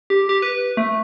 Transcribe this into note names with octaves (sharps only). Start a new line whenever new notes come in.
G4
G4
B4
A3